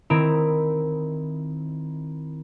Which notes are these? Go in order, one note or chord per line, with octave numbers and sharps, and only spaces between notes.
D#3 C4 E4 A#5 D7